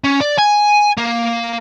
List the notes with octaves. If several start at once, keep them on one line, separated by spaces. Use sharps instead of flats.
C#4
D5
G#5
A#3